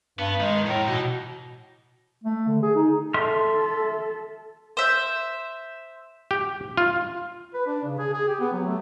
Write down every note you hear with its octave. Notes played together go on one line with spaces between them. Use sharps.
G2 B3
D#3 G#3
F2 A2 A#4
B2 E3 D#4
A3
D3
G#4
D#4
A4 E5 C6 F6
C5 E5
G4
F4
B4
D4
C#3
G#4
G#4
G4
B3
F#3
A3